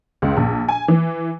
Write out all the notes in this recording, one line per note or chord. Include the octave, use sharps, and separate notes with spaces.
C#2
A#1
G#5
E3